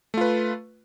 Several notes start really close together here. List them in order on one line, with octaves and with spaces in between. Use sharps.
A3 F4 B4